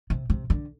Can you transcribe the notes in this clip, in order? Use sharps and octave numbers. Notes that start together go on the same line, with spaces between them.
C3
C3
D3